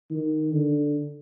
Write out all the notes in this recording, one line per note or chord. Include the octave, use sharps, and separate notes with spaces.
D#3
D3